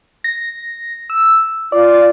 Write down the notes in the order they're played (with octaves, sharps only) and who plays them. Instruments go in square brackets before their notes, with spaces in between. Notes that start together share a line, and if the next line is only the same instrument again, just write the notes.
[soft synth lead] A#6
E6
[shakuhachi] F4 [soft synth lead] D5